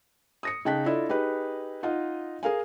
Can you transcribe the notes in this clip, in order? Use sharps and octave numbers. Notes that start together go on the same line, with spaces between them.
D#6 A#6 C#7
C#3 D#4 G5 A5 F#6 B6
D4 E4 F4 A4 D#5
D#4 G4 G#4 B4
D#4 F4 D#5 F#5
G#4 A#4 F5 G#5